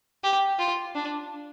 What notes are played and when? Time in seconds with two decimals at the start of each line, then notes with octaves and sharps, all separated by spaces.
0.24 G4
0.59 F4
0.95 D4